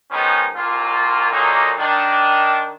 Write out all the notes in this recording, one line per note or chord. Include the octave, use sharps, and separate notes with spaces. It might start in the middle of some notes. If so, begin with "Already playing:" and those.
D#3 F3 G#3 B3 C#4 D#4
C2 A#2 A#3 F4
A#2 D3 F#3 A#3 D#4
D#3 D4